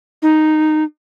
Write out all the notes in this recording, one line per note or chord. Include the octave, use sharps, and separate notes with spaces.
D#4